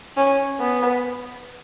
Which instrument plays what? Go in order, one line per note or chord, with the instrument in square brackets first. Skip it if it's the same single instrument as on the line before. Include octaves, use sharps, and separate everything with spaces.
[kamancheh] C#4
B3